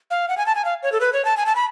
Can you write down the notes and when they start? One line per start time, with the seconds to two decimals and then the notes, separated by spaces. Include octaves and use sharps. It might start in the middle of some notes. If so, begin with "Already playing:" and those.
0.11 F5
0.29 F#5
0.37 G#5
0.46 A5
0.55 G#5
0.65 F5
0.83 C#5
0.92 A4
1.01 B4
1.13 C#5
1.25 A5
1.37 G#5
1.46 A5
1.55 B5